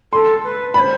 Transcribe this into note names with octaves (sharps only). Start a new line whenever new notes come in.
A4 C6
B4
C5 D5 B5